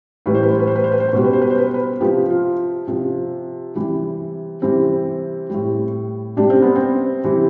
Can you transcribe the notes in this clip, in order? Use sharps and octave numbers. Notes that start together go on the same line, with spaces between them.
A2 E3 G3 B4
C5
B4
C5
B4
C5
B4
C5
B4
C5
B4
B2 G3 C5
B4
C5
B4
C5
B4
C5
B4
C3 F3 G4
F4
C3 F3
C3 E3 G3
C3 E3 G3 C4
A2 G3
C3 G3 D4
C4
B3
C4
C3 E3 G3